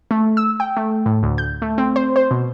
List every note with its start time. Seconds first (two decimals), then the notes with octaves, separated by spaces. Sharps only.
0.11 A3
0.37 E6
0.60 G5
0.77 A3
1.06 A2
1.23 D2
1.38 G6
1.62 A3
1.78 C4
1.96 C5
2.16 C5
2.31 B2